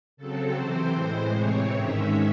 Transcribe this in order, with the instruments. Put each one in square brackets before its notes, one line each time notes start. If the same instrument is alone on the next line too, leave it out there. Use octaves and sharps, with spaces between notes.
[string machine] C#3 F#3 C4 A4
C3 E3 C4 C5
A2 E3 G#3
C3 E3 C4 C#5
G#2 D#3 G#3 C#4 E5